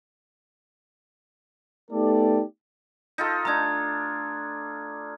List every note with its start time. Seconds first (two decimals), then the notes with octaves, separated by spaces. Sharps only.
1.91 A3 B3 D#4 G4 A4 D5
3.18 D#4 F4 A4
3.45 A3 D4 A#5 D#6 G#6